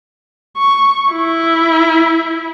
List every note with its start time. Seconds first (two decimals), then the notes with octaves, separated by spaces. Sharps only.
0.57 C#6
1.13 E4